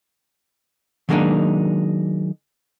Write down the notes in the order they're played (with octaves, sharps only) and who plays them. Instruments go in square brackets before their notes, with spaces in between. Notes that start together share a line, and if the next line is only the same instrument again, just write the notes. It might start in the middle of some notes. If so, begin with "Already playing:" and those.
[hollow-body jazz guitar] D#3 F#3 G#3 A#3 D4 D#4